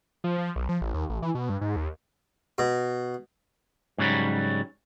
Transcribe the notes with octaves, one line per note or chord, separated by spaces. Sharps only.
F3
F3
B1
F3
A1
D#2
A1
E3
B2
G2
G#2
D#2
B2
G#2 C#3 F#3 G3